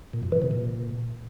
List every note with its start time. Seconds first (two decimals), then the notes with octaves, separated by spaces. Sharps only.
0.13 A#2
0.23 F#2
0.32 E3
0.42 C3
0.51 A#2